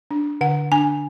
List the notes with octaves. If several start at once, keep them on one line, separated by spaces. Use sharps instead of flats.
D4
D3 F#5
D4 G#5